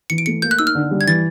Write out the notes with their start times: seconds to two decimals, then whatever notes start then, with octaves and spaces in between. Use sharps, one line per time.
0.10 E3 C#7
0.18 D7
0.26 A3 C#7
0.42 A#3 G6
0.51 F#6
0.59 D#4 E6
0.67 F6
0.75 D3
0.91 G3
1.01 G#6
1.07 E3 A6